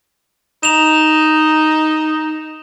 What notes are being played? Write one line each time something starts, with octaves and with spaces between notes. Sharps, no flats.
D#4 E7 F7